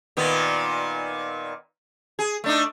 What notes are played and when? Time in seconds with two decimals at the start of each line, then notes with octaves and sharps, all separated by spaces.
0.17 A#2 D#3 B3
2.19 G#4
2.44 A3 D4 D#4